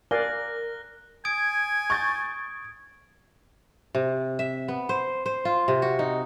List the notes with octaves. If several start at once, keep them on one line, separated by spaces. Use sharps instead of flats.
A#4 D5 F5 G#5 F#6 A#6 G7
G#5 D#6 G#6 D7
C#6 G6 A6
C3
E5
B3
C5
C5
F4
C3
F#4
D#4